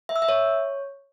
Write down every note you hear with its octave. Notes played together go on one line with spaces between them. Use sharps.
E5
E6
E5
C#5